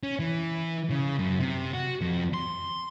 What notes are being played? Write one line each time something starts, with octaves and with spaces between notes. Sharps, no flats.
C#4
E3
C#3
F#2
C3
F#4
F2
C6